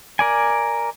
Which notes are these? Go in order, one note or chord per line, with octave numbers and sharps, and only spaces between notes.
A#4 D5 G#5